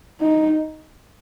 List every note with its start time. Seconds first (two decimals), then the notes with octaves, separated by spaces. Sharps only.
0.21 D#4